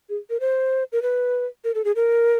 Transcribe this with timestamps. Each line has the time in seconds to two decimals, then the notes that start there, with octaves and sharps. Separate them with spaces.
0.09 G#4
0.30 A#4
0.40 C5
0.92 A#4
1.02 B4
1.64 A#4
1.75 A4
1.85 G#4
1.96 A#4